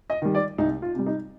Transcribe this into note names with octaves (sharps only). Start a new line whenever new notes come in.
D#5
D#3 G3
D5
C2 D#4
F4
C3 G3
D#4